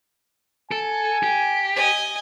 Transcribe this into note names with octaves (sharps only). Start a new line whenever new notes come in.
A4 G#5
G4
D#5 G#5